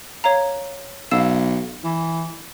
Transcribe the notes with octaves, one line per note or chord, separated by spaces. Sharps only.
C#5 F5 A#5
B1 F5 E6 E7
E3